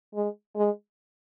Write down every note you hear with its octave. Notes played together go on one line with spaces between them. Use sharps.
G#3
G#3